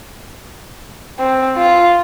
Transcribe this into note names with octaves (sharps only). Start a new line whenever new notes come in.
C4
F4